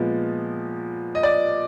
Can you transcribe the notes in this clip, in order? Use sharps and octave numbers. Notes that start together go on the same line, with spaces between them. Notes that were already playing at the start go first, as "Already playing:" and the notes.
Already playing: A#2 F3 G#3 B3
D#5
D5